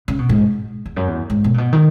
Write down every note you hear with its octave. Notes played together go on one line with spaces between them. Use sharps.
C#3
B2
G#2
E2
F#2
E2
G#2
B2
A#2
B2
D#3